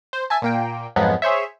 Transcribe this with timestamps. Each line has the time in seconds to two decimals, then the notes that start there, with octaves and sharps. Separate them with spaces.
0.13 C5
0.30 E5 G#5 A5
0.42 A#2 A#3 G5
0.96 F2 G#2 F3 F#3 G#3 B3
1.22 G#4 C5 C#5 E5